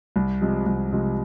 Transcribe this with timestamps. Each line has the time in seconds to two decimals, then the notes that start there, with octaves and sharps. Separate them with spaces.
0.16 C2
0.41 C3 F3 G#3
0.66 C2
0.92 C3 F3 G#3